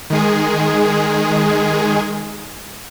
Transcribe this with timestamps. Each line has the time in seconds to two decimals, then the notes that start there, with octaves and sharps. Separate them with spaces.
0.10 D#3 G#3 G#4